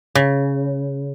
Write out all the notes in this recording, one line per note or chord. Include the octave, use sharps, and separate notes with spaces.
C#3